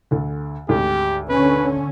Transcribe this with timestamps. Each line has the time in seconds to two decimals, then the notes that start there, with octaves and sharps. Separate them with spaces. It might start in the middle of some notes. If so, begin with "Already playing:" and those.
0.11 D2 D3
0.69 G#1 D2 G#2 G4
1.29 D3 C#4 B4